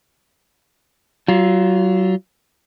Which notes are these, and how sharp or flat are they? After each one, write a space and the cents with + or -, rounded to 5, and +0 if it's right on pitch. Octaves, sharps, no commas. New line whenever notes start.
F#3 +30 F4 +0